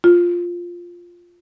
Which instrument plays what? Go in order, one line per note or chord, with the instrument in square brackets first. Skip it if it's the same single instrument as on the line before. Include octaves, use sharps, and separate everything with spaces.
[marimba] F4